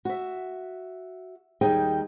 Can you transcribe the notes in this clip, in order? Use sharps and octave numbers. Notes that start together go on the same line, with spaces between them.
F#4 E5
D#2 G3 D#4 G#4 D#5 G5